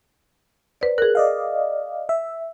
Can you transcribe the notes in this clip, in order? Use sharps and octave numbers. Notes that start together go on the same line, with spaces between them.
B4 C5 D5
G#4 A#4 F#6
D5 D#5 F5
E5